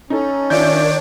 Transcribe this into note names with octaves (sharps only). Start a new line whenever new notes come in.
C#4 D#4 A4
D#3 D4 F4 C#5 D5 E5 G6